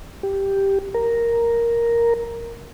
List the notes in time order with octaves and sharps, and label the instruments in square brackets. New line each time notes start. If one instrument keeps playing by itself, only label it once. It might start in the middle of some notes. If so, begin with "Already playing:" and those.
[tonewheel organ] G4
A#4